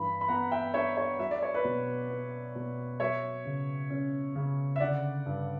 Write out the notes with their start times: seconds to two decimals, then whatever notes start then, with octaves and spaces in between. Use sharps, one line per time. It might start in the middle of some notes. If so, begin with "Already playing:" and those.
Already playing: G2 E3 B5
0.21 B5
0.28 B3 F#5 A#5
0.51 E5 G5
0.74 D4 C#5 E5
0.97 C#5
1.19 F#3 E5
1.31 D5
1.42 C#5
1.54 B4 D5
1.64 B2
2.09 B3
2.55 B2
3.00 F#3 C#5 E5
3.45 C#3
3.90 C#4
4.35 C#3
4.76 E5
4.80 D3 D5 F#5
5.26 G2